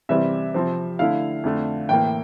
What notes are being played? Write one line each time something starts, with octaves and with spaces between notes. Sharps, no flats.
C3 E3 G3 C4 E5
C3 F3 C4
D3 A3 E4 F5
F2 D3 A3
A2 E3 A#3 G5